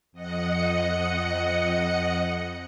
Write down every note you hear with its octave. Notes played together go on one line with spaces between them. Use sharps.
F2 D#5 F#5 C#7